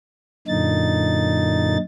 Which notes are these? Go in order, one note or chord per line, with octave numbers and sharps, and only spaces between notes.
F#2 A#2 D3 D#4 A6